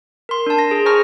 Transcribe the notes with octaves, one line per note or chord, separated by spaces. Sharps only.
A#4 C6
D4 A5
A#6
G#4
C5 G#5 A#5 C#6 F6 A#6